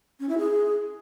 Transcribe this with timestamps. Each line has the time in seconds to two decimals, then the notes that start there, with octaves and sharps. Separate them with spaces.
0.20 C#4
0.29 E4
0.38 G#4